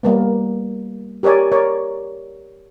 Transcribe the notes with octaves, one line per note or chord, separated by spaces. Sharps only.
G3 A#3 B3
G4 A#4 C#5 D5 G#5
A#4 C#5 D5